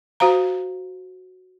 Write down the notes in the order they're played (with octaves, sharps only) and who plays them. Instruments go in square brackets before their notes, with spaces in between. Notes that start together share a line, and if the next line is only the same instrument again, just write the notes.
[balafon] F#4 C5 F5 A#5